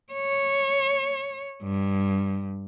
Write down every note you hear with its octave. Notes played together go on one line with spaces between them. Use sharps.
C#5
G2